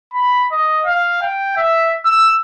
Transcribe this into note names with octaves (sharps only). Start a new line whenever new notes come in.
B5
D#5
F5
G5
E5
E6